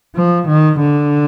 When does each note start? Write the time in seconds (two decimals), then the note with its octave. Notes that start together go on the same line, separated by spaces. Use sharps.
0.16 F3
0.48 D#3
0.81 D3